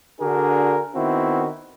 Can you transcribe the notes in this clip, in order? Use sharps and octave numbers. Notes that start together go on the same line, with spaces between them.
D3 D4 F#4 G#4 A#4
D#3 B3 C4 E4 F#4